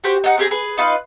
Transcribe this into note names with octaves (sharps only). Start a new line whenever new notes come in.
F#4 G4 C5
D#4 F#5
C4 G4 G#4 A#5
G#4 B4
D#4 F4 B4 F5